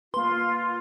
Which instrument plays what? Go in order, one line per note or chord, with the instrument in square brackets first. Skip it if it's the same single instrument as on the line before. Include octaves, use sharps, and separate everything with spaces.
[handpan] A#3 B4 [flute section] F4 [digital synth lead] C6